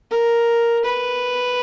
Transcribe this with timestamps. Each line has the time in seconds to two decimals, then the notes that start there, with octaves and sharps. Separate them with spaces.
0.11 A#4
0.85 B4